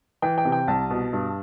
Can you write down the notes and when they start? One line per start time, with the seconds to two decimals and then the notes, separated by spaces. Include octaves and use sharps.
0.22 E3 G5
0.38 G5
0.45 C3
0.52 G5
0.68 C2 A5
0.90 B2
1.13 G2